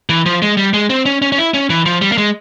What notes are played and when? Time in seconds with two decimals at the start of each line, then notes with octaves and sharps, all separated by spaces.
0.09 E3
0.26 F3
0.42 G#3
0.57 G3
0.74 G#3
0.90 C4
1.06 C#4
1.22 C#4
1.32 C#4
1.38 E4
1.54 C#4
1.70 E3
1.86 F3
2.02 G3
2.12 A#3
2.18 G#3